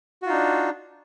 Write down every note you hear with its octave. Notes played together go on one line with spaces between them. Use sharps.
D4 D#4 F4 F#4